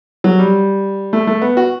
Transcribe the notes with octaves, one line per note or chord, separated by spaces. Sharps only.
F#3
G3
A3
A3
B3
F#4